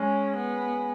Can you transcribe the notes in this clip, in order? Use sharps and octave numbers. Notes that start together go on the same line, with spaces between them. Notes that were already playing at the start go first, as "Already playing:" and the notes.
Already playing: G#3 C#4
B3